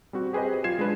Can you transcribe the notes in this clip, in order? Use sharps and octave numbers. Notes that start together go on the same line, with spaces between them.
G3 C4 F#4
G4 G#4 B4 C5 D#5
F#3 F4 G#6 C7 E7
G#3 D4 B4